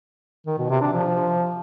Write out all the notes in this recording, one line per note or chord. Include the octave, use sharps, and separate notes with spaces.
D#3
B2
C3
D4
F3